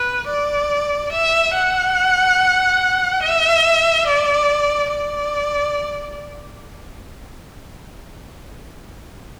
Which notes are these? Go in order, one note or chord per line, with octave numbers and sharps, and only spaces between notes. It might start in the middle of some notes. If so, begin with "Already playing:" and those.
Already playing: B4
D5
E5
F#5
E5
D5
D5